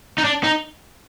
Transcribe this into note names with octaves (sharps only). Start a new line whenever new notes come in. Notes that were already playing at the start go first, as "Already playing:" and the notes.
D#4
D4
D#4